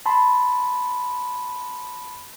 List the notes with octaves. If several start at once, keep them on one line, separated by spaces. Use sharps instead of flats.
A5 B5 C6